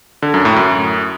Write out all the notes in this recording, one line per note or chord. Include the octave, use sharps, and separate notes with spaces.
D3
F#2
A2
F#2